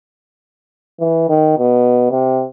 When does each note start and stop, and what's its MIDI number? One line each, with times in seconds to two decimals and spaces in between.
1.00 1.25 52
1.29 1.54 51
1.58 2.07 47
2.11 2.45 48